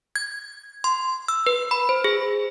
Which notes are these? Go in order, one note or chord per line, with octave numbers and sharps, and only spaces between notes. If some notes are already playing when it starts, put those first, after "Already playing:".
G#6
C6
E6
B4
B5
C5
G#4